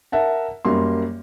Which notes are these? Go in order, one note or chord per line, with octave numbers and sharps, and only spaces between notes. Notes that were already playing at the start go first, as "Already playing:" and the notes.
A#4 E5 F#5 A5
F#2 G3 A#3 C6